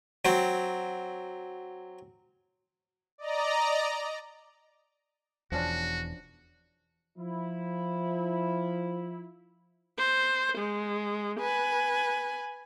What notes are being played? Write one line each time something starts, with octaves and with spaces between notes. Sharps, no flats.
F#3 C4
D5 D#5 A#5
E1 E2 F3 C#4 D4 F#4
F3 E4
C5
G#3
B4 G#5